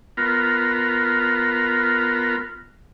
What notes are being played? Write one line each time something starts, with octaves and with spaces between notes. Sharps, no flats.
B3 F4 A#4